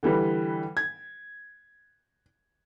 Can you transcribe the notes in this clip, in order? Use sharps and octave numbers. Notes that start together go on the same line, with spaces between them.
D3 E3 G3 B4
G#6